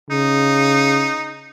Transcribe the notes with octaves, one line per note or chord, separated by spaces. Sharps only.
C#3 D#4